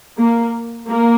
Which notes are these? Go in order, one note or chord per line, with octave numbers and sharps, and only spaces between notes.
A#3
A#3